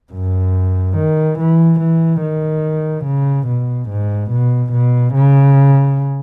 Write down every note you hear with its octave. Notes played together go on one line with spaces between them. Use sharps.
F#2
D#3
E3
E3
D#3
C#3
B2
G#2
B2
B2
C#3